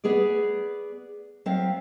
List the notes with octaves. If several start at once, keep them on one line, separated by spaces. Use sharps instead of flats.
B3 G#4 B4 D5
F#3 C4 E5 F5